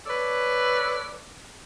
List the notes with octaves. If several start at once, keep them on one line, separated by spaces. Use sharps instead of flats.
A4 B4 C#5 D5